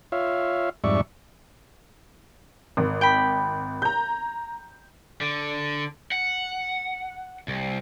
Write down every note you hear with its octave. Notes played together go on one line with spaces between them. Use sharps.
F4 C#5 E5 F5
F2 G#2 G3 D5 E5 C#6
G#1
G5 B5
A#5 G6
D3
F#5
C2